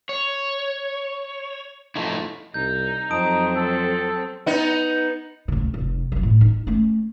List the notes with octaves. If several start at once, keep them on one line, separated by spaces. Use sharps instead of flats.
C#5
F3 A3 D#4 E4
C2 D#4 G6
F2 F#3 C4 D#4 A5 D#6 D7
A4
B3 D#4
D2 C#3
F1
E3 F#3
A2
D#4
A3 C#4